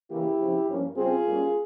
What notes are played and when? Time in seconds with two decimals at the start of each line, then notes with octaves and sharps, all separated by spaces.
0.10 C#3 E3 A#3 C#4 E4 G4
0.38 C#3 F3 C4
0.68 G2 F3 A#3 C#4
0.96 C#3 G3 C4 F4 G#4
1.24 G#2 G3 A#3 C#4